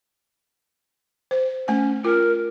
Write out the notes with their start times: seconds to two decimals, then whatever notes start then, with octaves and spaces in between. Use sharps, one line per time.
1.31 C5
1.68 A3 C#4 G#5
2.05 F4 A#4